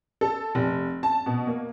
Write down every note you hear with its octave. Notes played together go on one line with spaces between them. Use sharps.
A4
F1
A5
B2
A#3